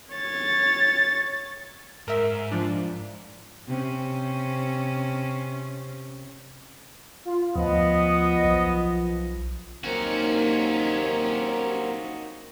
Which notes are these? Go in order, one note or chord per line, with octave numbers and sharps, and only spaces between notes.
C#5 A6
G#2 A#4 E5
F3 D4
C3 C#4
F4
D2 F3 B3 D#5
B1 F3
D#2 F#3 A#3 C4 C#4 D#4 F#4